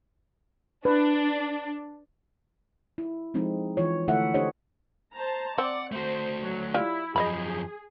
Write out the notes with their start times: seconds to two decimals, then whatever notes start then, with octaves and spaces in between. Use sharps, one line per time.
0.85 D4 B4
2.98 E4
3.34 F3 G#3 C4 D#4
3.77 E3 F4 C#5
4.08 D3 A3 E4 A4 E5 F#5
4.34 D4 G4 A4 C5 C#5 D#5
5.14 C5 A5 A#5
5.58 C4 D5 F#5
5.92 A3 F#4 C5
6.42 F#3
6.74 E4 F4 G4 D5
7.16 F#2 F3 G#4 D#5 F5 B5